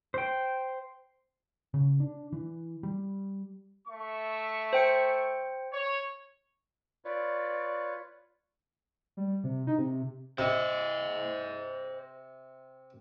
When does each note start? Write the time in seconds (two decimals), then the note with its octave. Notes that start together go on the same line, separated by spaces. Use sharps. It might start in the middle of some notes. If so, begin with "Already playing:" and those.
0.14 C5 G5
1.74 C#3
2.00 D4
2.33 E3
2.83 G3
3.88 A3 E5 C#6
4.73 C5 G5 C#7
5.72 C#5
7.05 F4 B4 C#5 D5
9.17 G3
9.44 C3
9.67 D#4
9.78 C3
10.38 C3 C5 D#5